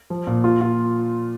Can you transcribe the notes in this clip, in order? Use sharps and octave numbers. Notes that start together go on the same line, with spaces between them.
F3
A#2
F4
F4